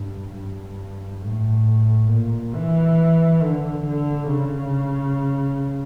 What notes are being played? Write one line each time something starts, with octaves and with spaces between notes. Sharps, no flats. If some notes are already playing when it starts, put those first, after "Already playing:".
Already playing: G2
G2
A2
A#2
E3
D3
D3
C#3